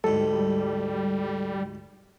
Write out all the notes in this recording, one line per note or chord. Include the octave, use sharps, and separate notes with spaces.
D2 G#2 G3 A4